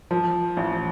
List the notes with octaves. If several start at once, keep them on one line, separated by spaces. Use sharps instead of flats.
F3
A1